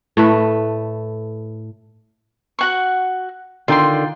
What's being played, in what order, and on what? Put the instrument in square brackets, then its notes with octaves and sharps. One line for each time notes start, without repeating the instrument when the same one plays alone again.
[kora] A2 A3 B4
[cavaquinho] F#4 F#5 C#6
[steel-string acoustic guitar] D3 D#3 [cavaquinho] F4 G5 C6